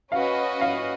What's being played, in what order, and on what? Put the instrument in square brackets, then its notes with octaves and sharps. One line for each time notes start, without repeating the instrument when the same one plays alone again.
[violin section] C#4 F#4 B4 D#5 [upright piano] F5
[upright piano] F5